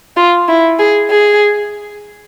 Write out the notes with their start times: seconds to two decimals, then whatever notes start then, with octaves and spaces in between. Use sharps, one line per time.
0.17 F4
0.49 E4
0.79 G#4
1.11 G#4